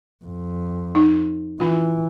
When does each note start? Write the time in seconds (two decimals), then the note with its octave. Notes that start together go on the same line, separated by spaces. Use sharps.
0.25 F2
0.95 D#4
1.60 E3 C#4 F4